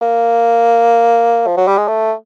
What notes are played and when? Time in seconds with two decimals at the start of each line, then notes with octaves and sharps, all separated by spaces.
0.01 A#3
1.47 F3
1.57 F#3
1.68 G3
1.78 G#3
1.88 A3